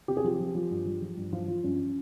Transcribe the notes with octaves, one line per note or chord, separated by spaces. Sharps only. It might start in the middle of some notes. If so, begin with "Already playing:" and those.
C3 G4
G#4
F3 G4
F3
F3
G2
F3
F3
G2
F3 F4
F3
G2 C#4